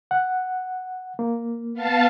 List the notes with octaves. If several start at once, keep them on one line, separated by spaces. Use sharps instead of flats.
F#5
A#3
B3 F5 A5